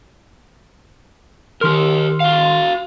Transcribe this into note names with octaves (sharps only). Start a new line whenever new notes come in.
D#3 G4 A#4 C6 F6
F#4 F5